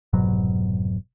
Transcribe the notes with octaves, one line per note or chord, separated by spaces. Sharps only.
F1 G#2 B2 F#3